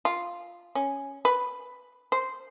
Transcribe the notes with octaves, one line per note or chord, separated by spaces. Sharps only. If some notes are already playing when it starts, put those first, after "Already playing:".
F4
C#4
B4
C5